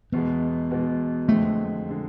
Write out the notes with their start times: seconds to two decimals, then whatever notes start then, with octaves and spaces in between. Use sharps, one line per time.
0.12 E2 B2 G#3 B3
0.71 E2 B2 G#3
1.28 F2 D3 G#3 A3
1.89 D3 G#3